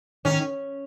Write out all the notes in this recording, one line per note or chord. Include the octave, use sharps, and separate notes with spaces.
D#3 C#4